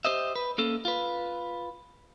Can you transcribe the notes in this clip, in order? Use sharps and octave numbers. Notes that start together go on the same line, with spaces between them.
G4 A4 C5 D#5 E5
B4
A#3 C#4 A4
F4 B4